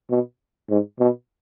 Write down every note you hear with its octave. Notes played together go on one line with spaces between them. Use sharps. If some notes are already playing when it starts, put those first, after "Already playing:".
B2
G#2
B2